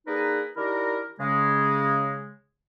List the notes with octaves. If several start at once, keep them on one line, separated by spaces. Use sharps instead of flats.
A#3 D4 D#4 G#4 A#4 B4
D#3 D4 E4 G4 A#4
C#3 G#3